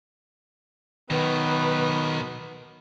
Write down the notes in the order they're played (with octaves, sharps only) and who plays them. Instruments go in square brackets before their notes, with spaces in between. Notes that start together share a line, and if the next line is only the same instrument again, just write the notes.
[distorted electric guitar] B2 F#3 [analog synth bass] D#3 [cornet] B3 [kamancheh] B4